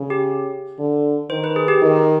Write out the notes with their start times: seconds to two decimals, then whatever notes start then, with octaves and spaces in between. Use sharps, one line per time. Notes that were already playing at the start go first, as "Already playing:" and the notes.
Already playing: C#3
0.10 G4
0.79 D3
1.30 D#3 C5
1.44 B4
1.56 G#4
1.68 G4
1.82 D#3